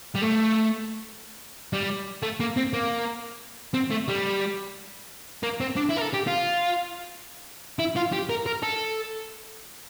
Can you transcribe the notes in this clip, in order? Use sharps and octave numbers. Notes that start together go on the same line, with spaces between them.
G3
A3
G3
A3
A#3
C4
A#3
C4
A3
G3
A#3
C4
D4
E4
A#4
A4
G4
F4
E4
F4
G4
A#4
A#4
A4